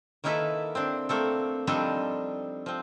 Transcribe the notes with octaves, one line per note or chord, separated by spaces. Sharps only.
D#3 A#3 D#4 E4 A4 B4
C4 D4
A3 A#3 C4 A4
F3 G3 C4 D4 D#4 A4
F3 C4